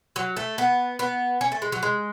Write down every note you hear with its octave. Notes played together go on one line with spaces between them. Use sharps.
F#3
A3
B3
B3
C#4
A3
G#3
F#3
G#3